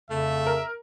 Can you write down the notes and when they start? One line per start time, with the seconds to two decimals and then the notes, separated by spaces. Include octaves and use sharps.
0.10 F2 C#3 A3 E5
0.46 A#4